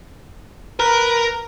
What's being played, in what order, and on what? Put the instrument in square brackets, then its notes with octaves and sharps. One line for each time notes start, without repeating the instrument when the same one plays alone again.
[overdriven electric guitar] A#4 [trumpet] B4